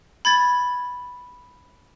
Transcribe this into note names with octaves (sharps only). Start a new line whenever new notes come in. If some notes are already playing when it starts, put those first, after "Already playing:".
B5 G#6 A6